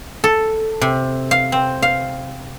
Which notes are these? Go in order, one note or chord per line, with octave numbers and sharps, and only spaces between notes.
A4
C3
F5
C4
F5